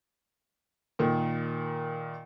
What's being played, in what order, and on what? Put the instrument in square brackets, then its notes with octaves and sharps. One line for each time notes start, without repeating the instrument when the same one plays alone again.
[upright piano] A#2 D#3